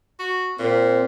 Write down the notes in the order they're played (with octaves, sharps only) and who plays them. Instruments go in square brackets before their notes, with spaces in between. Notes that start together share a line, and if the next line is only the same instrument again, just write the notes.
[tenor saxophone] F#4
[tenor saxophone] A#2 [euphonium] C4